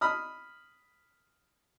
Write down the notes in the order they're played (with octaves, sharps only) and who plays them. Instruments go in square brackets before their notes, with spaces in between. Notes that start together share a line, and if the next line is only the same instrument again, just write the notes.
[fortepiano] B5 D#6 F6